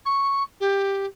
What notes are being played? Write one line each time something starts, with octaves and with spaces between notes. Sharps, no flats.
C#6
G4